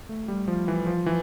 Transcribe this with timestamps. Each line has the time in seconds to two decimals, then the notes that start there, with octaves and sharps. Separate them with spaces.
0.09 A3
0.28 G3
0.48 F3
0.68 E3
0.87 F3
1.06 E3